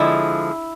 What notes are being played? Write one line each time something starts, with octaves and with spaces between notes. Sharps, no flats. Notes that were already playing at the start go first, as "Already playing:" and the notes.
Already playing: D3 F3 G#3 E4